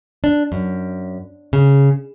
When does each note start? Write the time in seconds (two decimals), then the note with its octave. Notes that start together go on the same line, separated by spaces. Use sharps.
0.24 D4
0.52 F#2
1.53 C#3